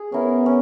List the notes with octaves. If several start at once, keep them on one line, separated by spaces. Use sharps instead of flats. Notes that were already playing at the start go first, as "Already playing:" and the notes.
Already playing: G#4
B3 C#4 E4 A#4
C#4